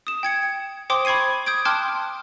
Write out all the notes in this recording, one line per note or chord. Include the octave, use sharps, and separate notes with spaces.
D#6 E7
G5 G#6 C#7
C5 G5 C6 D6 D#6
B5 C#6 G#6 C7 D#7
D#6 G6 G#6 D7
G5 A5 C6 D6 F6 F#6